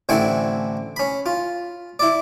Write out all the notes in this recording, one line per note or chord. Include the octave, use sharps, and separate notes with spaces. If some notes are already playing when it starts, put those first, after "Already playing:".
A1 D3 C4 E4 G#5 C#6
C#4 B5
F4
E4 D5